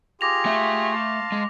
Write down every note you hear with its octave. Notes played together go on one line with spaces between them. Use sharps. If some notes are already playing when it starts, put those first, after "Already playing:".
F4 G4 G#4 D6 A#6 F7
A3 E5
F5 A5 C6
G#3